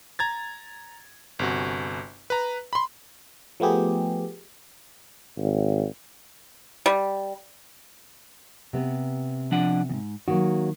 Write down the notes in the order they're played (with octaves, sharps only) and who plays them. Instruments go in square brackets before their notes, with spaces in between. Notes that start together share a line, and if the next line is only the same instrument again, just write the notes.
[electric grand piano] A#5 G#6 A6
G1 C3 F#4
B4 A#5
B5 C6
[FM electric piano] F3 A3 B3 G4 G#4
[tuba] G#1
[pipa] G3
[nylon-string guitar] C3 B3
[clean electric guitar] F3 D4 F#5
E2 G#2
[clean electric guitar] D#3 [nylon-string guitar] F#3 A#3 F#4